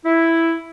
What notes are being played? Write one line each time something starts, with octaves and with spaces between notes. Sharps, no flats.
E4